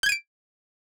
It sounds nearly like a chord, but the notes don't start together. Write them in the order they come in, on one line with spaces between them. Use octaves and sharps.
G6 G#6 D#7 D7